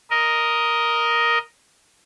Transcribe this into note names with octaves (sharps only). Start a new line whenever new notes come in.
A#4 D#5